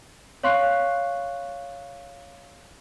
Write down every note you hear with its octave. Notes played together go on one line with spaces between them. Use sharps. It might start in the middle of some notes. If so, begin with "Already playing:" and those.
C#5 F5 C6 C#6 F#6 C7